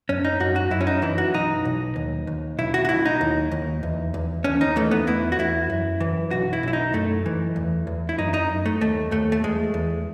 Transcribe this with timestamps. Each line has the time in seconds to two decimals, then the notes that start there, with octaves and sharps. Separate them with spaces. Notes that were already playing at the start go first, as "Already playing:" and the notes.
0.09 F#2 C#4
0.25 D#4
0.40 F#2 F#4
0.56 F#4
0.71 F#2 E4
0.81 C#4
0.87 D#4
1.02 E3 E4
1.18 F#4
1.34 B1 D#4
1.65 B1
1.96 D#2
2.27 D#2
2.59 B1 E4
2.74 F#4
2.85 F#4
2.89 B1 E4
3.05 D#4
3.21 D#2
3.51 D#2
3.83 E2
4.14 E2
4.44 D#2 C#4
4.61 D#4
4.76 E3 A3
4.91 B3
5.07 E2 E4
5.32 F#4
5.39 E2 E4
5.70 F#2
6.00 E3
6.31 B1 F#4
6.53 E4
6.63 B1 E4
6.73 D#4
6.93 F#2 A3
7.26 E3
7.56 E2
7.87 E2
8.09 E4
8.18 F#2 D#4
8.34 D#4
8.50 F#2
8.66 A3
8.81 D#2 A3
9.12 D#2 A3
9.32 A3
9.44 E2 G#3
9.74 E2